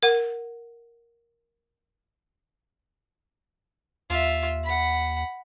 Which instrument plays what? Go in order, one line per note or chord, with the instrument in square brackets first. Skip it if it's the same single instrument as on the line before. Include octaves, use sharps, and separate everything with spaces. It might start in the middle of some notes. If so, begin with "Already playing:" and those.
[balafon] A#4 F#5
[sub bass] D#2 [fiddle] F4 E5
[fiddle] F#5 B5